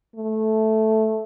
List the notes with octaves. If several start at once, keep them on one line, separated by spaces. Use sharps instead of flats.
A3